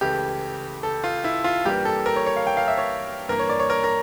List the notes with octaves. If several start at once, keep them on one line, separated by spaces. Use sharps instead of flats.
C#2 C#3 E3 A3 G4
A4
F4
E4
F4
G2 E3 G3 A#3 G4
A4
A#4
C#5
C#5
F5
G5
F5
E5
C#5
G2 E3 A#3 A#4
C#5
D5
C#5
A#4
A#4